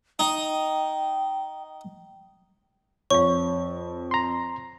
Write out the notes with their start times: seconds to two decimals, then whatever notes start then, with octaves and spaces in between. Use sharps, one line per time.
0.19 D#4 G5
3.10 F2 C#5 F5 C#6
4.11 A#5 C6